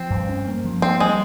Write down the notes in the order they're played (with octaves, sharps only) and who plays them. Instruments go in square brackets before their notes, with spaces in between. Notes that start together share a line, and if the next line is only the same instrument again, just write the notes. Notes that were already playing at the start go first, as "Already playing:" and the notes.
Already playing: [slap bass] F3 [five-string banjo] C4
[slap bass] G2
C#4
A#3
F3
[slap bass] A#3 [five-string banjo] C4
[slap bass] G3 [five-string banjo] G#3